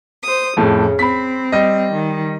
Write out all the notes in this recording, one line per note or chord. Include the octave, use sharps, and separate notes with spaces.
C5 D#6
F2 A2 C#3
C4 B5 B6
G3 D#5
D#3